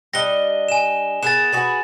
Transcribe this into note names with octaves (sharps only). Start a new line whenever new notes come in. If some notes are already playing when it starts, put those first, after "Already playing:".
G3 D4 D#5 A#6 G7
G#5 E7
B3 G#4 A#4 A6 E7
F#4 G#4 B4